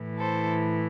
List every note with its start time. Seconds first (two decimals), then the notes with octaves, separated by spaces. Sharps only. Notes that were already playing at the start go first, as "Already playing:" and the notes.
Already playing: A2 E3
0.19 A4 C5